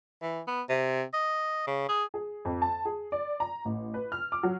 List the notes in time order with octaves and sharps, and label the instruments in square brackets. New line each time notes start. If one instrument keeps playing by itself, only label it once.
[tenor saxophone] E3
B3
C3
D#5
C#3
G#4
[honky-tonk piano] G#4
F2
A5
G#4
D5
A#5
A1
B4
F6
D6
F#3